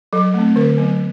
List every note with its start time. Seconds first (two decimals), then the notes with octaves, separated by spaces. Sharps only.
0.13 F#3 A4
0.34 A3 C4
0.56 D3 A#4
0.78 F#3 B3